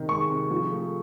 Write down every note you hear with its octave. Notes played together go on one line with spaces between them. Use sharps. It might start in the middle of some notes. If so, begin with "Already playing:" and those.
Already playing: C3 D#3
G#3 C#6
C3
F3
A3